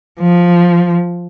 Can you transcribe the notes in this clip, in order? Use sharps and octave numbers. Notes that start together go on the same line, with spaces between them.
F3